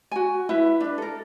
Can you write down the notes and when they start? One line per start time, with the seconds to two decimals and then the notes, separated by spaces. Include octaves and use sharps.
0.11 F#4 G#5
0.49 E4 B4 E5
0.80 D4 B4
0.98 A4 A#4